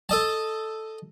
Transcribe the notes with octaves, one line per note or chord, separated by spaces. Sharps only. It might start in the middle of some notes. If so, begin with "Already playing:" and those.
A4 D#5 A5